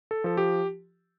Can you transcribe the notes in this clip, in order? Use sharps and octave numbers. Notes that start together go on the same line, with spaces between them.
A4
F3 A4
G4